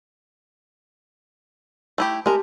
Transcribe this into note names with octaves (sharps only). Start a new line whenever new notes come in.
A3 E4 G4
G#3 G4 A#4 A5